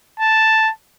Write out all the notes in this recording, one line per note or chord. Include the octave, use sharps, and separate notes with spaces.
A5